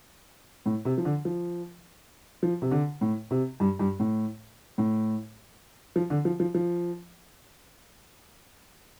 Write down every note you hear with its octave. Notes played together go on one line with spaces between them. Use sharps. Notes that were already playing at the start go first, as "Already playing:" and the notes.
A2
C3
F3
D3
F3
F3
C3
D3
A2
C3
G2
G2
A2
A2
F3
D3
F3
F3
F3